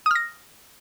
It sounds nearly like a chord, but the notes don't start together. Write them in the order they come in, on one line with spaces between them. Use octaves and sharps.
D#6 F6 A#6